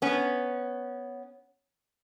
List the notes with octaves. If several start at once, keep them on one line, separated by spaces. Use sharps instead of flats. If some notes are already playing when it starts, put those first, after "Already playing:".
B3 C#4